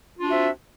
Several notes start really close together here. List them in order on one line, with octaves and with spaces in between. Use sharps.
F4 D4 F#4 E5 C4